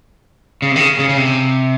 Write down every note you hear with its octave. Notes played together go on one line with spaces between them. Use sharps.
C#3
C3
D#3
C#3
C#3
C#3
C3